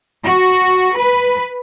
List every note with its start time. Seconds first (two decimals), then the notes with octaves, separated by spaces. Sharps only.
0.24 F#4
0.98 B4